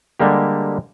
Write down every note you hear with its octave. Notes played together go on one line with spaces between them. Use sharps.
D3 G3 G#3 A#3 G4